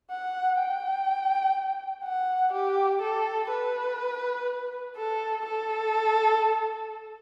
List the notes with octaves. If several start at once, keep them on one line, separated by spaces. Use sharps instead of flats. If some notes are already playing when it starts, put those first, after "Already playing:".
F#5
G5
F#5
G4
A4
B4
A4
A4